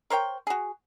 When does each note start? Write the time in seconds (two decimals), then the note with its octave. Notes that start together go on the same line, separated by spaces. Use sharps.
0.10 A#4 C5 C#5 G5
0.47 F#4 G#4